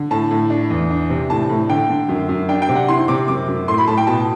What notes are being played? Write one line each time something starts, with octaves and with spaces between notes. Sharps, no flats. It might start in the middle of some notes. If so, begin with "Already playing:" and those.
Already playing: D3
A2 A5
A2
D4
E2
D4
C3
A2 A5
A2
D3 G5
D3
F#2
F#2
D4 G5
G5
C3
F#5
E4 C6
C3 D6
F#2 D6
F#2
A2 C6
B5
A2 A5
G5
B2 A5